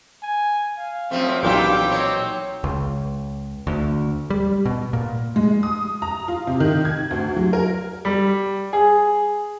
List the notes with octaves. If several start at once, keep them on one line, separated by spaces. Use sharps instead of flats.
G#5
F5
F#2 F3 A3 C4
B1 G2 A#2 E3 F4 G4 G5 D6
F#3 C4 D#4 C#5
C#2
D2
G3
B2
A#2
G#3
D#6
A#5
F4
C3
D#3
G#6
D2
F#3
A#4
G3
G#4